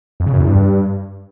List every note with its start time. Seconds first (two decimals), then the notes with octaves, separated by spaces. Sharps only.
0.20 F2
0.27 C#3
0.33 F#2
0.40 E2
0.46 G2